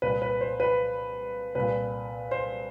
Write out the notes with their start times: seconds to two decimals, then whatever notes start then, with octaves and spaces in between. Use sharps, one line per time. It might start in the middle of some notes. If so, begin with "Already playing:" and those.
0.02 C2 A#2 B4
0.22 B4
0.41 C5
0.60 B4
1.55 C2 A#2 B4
2.31 C5